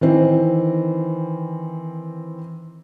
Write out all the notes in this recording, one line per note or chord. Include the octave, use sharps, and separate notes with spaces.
D#3 E3 C4